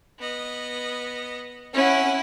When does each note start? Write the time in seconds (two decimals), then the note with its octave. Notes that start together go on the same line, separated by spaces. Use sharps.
0.19 B3 D#5
1.74 C#4 E4 F#5